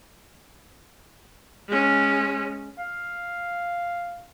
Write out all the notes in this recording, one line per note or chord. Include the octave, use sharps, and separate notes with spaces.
G#3 C#4
F5